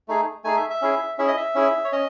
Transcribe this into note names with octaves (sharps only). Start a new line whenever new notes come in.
A3 D#4 G#4
A3 D#4 G#4 G#5
E5
E5
C#4 E4 G#4
C#4 E4 G#4 E5
D#5
E5
C#4 E4 G#4
C#5
C#4 D#5